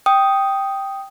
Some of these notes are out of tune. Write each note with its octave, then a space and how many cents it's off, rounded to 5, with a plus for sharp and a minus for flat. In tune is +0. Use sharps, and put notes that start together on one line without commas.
G5 +0 D#6 +0